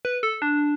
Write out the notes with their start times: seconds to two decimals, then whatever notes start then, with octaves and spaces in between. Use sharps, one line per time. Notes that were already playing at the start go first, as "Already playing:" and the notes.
0.05 B4
0.23 A4
0.42 D4